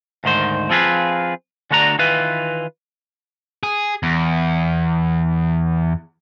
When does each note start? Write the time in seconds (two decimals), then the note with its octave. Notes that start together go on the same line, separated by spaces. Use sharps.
0.24 D2 G#2 D#3 C5
0.70 F3 C4 F4 G#4 B4
1.71 D3 A3 D4 F#4 A#5
1.99 D#3 E3 F4 B4
3.63 G#4
4.03 E2